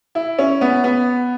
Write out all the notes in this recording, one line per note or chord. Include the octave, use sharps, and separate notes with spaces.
E4
C#4
B3
B3